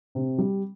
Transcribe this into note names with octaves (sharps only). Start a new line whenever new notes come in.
C3
G3